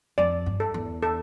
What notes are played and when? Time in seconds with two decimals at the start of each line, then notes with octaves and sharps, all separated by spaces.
0.18 F2 D5
0.46 G2
0.60 A4
0.74 E2
1.03 A4